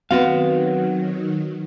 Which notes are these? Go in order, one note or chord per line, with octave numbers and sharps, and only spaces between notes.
D#3 F#3 B3 C4 F#4 F5